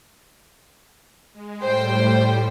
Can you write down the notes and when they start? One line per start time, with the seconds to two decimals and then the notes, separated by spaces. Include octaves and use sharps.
1.33 G#3
1.61 A2 G3 C5 G5